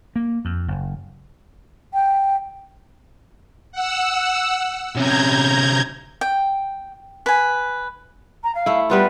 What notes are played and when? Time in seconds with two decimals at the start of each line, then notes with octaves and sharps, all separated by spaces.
0.16 A#3
0.45 F2
0.68 F#1
1.94 G5
3.72 F#5 E6
4.95 C3 C#4 A#5 G6 G#6
6.21 G5
7.26 B4 G#5
8.43 A#5
8.55 F5
8.66 A3 E4
8.90 G3 B3 F4 B4